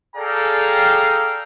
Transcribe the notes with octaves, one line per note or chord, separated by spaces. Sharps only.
G#4 A4 D5 F5 G5 A#5